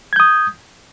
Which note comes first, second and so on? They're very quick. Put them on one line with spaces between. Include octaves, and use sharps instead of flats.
G#6 G6 D#6